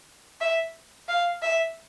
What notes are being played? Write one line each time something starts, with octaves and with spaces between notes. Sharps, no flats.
E5
F5
E5